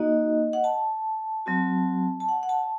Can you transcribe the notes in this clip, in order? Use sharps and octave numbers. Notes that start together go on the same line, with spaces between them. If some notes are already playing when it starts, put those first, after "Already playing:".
Already playing: A#3 D#4 F#4 D#5
F#5
A5
F#3 C4 F#4
A5
F#5
F#5
A5